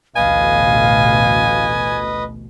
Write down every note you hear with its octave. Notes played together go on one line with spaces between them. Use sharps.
A1 D2 B2 B4 D#5 F5 G#5